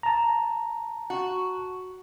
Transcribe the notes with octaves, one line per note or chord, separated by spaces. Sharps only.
A5 A#5
F#4